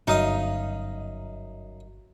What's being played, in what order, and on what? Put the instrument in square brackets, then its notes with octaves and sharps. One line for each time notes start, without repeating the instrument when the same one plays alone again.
[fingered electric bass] G1 [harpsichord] F#2 D#5 D#6 [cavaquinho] D#4 F5